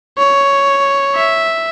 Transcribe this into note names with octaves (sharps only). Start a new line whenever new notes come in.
C#5
E5